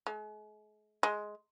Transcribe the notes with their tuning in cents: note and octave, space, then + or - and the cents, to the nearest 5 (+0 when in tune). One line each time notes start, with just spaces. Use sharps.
G#3 +40
G#3 +10